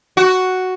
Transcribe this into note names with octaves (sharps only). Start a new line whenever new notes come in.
F#4